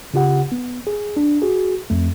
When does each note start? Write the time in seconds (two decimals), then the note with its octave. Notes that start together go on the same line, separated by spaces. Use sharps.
0.14 C#3 F4 G4 F#5
0.52 B3
0.87 G#4
1.17 D4
1.42 F#4 G#4
1.90 F2 A3